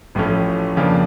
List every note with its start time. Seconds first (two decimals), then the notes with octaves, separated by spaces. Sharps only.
0.15 A1 A2 F3 A3 C#4
0.76 F2 C#3 F3 A#3 D4